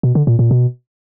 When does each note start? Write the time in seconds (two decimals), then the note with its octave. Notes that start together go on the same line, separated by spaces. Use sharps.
0.03 B2
0.15 D3
0.27 A#2
0.39 A#2
0.51 B2